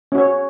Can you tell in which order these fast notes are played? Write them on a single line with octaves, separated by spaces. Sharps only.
C#4 F#4 C#5